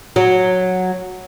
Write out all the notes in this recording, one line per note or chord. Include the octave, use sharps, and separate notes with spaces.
F#3